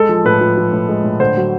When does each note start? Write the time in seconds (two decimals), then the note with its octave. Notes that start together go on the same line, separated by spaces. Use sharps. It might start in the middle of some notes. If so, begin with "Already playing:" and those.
Already playing: G#3 A4
0.09 F3
0.25 A2 B4
0.41 F3
0.57 F3
0.72 A2
0.89 G#3
1.04 A2
1.20 D3 C5
1.37 F#3